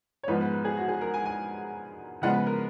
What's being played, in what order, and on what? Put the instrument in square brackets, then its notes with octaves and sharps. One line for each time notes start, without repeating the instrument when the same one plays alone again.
[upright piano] C#5
G#2 F3 G#3 B3 B4
B4
B4
G#4
F#4
G#4
A#4
G#5
G#5
C#3 F3 G#3 B3 F#5
B4
A#4